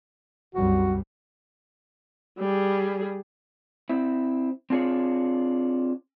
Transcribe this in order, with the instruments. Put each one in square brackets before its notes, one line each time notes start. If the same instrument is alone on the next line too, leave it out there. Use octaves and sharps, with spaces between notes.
[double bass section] C2 F#2 G3 [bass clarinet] F#4
[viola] G3 G#4
[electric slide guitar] C4 E4
C4 D4 F4 G#4 C#5